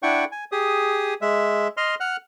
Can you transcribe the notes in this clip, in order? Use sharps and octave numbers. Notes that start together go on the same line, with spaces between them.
D4 E4 F#5 G5 C#6
G#5
G4 G#4 D#6
G#3 E5
D#5 C6 F6
F#5 F6 F#6